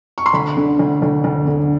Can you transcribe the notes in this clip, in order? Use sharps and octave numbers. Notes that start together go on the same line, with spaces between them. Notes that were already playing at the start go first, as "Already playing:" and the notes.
C#6
C6
D2 B5
D3
D2
D2
D2
D3